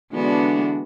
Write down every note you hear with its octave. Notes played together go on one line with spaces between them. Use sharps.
D3 E3 G#3 B3 D4 F#4